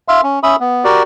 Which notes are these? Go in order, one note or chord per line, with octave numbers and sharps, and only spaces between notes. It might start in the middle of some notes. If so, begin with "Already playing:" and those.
E5 F5 C6
C#4
C#4 E5 B5 D#6
B3
F#4 G4 A#4 D5